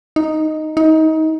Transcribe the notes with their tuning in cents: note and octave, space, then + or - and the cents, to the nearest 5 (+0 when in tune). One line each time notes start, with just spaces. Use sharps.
D#4 +0
D#4 +25